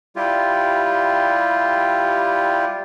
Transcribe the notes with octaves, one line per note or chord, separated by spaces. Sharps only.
G3 E4 F4 G4